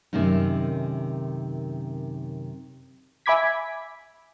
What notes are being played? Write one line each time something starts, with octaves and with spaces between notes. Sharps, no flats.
F#2 C3 D#3 A3 C#4 D#4
E5 G#5 B5 D6 G#6 B6